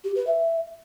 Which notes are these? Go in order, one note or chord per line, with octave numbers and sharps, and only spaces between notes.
G4
B4
E5